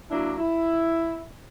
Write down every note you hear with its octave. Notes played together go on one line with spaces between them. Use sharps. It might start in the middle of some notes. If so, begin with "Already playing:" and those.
F#3 A#3 D4 E4
E4